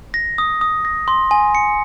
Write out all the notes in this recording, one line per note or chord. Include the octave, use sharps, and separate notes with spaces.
A#6
D#6
D#6
A#6
C6
G#5
C#7